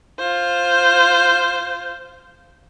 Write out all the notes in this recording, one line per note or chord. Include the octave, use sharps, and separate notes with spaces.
F4 C5